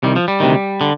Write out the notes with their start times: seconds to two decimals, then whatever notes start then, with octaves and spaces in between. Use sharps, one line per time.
0.03 C2 C3 D#3 G3
0.16 F3
0.28 G3
0.40 D2 C3 D#3
0.81 D3